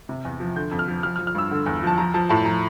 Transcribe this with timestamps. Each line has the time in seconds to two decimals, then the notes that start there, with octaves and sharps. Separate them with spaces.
0.09 C3
0.25 E2
0.40 F3
0.56 D3 G6
0.71 F2
0.79 F6
0.88 F3
1.03 F3 F6
1.16 F6
1.19 F3
1.27 F6
1.35 G2 E6
1.51 D3
1.66 E2
1.83 F3 A5
1.98 F3 A#5
2.14 F3 A5
2.29 A2 A5
2.45 F3 A#5